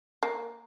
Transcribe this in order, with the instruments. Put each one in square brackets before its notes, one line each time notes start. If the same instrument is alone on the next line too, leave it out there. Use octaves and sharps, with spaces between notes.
[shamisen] A#3